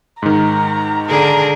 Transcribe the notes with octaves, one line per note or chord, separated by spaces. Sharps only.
G#2 D#3 A#5
D3 G#4 A#4 A#5